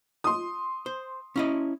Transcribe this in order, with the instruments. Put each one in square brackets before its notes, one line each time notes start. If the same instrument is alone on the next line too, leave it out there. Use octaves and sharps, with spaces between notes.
[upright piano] C6 D#6
[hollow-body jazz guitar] C5
C#4 E4 D#5